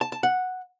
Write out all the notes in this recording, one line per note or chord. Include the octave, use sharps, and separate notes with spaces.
A5
A5
F#5